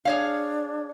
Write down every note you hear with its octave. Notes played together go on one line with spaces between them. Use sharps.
D4 G#4 C#5 F5